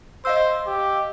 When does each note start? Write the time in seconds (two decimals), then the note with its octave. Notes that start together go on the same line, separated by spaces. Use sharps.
0.25 C5 D#5 F5 E6
0.67 G4